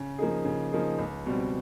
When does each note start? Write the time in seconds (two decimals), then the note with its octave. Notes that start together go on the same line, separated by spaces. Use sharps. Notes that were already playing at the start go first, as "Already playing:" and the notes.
Already playing: C#3
0.18 F3 A#3 D#4 G#4
0.45 C#3
0.72 F3 A#3 D#4 G#4
0.99 C#2
1.26 B2 G3 C4